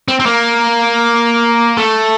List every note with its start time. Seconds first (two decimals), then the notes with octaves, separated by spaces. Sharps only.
0.08 C4
0.20 C4
0.26 A#3
1.77 A3